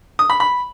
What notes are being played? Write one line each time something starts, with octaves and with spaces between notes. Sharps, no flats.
D#6
B5
B5